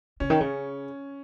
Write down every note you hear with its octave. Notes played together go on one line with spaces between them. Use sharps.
C#3 C#4
D#3
C#3